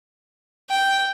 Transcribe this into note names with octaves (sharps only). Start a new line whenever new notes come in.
G5